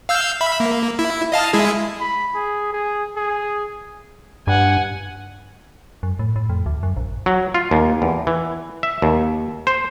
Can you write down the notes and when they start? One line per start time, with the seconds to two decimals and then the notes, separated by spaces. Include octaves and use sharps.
0.09 F5 E6 G6
0.41 E5 B5
0.60 A#3
0.99 E4
1.32 D#5 F5 A5
1.53 G#3 E4 G#4
2.00 B5
2.35 G#4
2.72 G#4
3.16 G#4
4.47 G2 F#5 G#5
6.03 F#2
6.19 A2
6.36 A2
6.49 F2
6.66 D2
6.83 F#2
6.97 A#1
7.26 F#3
7.54 F4
7.71 D#2
8.02 E2
8.27 E3
8.83 E5
9.02 D#2
9.67 C5